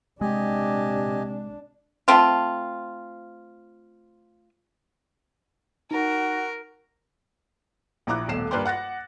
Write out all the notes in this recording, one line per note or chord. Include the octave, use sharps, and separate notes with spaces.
C3 G#3 D4 G4 D#5 G#5
A3 C4 F4
D#4 F#4 A#4
A#1 E4 A#5 D6 F#6
D#1 B1 A3 C7 E7
G2 A#3 B4 D5 G5 C6
F#5 F#6 A6 A#6